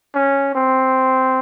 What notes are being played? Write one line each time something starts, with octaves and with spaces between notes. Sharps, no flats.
C#4
C4